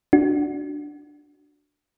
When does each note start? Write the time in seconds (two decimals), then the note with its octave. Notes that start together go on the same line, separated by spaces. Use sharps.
0.13 D4 F#4